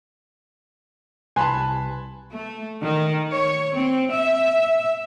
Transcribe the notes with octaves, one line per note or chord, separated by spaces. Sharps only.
C2 B4 G#5 A5 B5 C6 F#6
A3
D#3
C#5
C4
E5